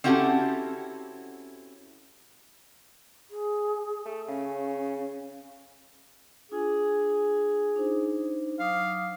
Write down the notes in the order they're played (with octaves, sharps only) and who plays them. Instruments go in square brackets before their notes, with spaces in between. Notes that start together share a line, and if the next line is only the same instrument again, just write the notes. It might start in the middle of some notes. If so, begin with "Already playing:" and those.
[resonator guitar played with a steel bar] C4 C#4 E4 F#4 G4 A4
[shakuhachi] G#4
[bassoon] A3
[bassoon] C#3 [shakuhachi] C#4
[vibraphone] D4 F4 G#5 [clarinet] G#4
[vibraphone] D4 D#4 C5
[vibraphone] F#3 D6 D#6 [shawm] F5